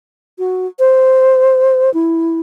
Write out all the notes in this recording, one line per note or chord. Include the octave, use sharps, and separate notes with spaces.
F#4
C5
E4